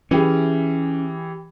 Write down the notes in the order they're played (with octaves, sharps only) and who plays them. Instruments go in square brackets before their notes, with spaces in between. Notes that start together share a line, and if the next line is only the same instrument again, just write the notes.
[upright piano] E3 G4 G#4 [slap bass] C#4